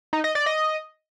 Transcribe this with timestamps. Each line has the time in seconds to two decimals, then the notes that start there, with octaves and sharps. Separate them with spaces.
0.13 D#4
0.24 D#5
0.35 D5
0.46 D#5